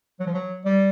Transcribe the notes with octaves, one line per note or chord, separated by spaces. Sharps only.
F#3
F3
F#3
G3